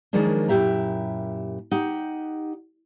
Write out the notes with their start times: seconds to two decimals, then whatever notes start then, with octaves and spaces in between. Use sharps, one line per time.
0.13 D#3 F3 F#3 G#3 A#3 D4
0.48 F#2 A#2 E4 G4 E5 A#5
1.71 D#4 G4 F#5